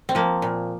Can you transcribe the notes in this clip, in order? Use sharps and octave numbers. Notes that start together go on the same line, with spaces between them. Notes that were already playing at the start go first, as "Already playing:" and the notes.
C4
F3 A#3
A#2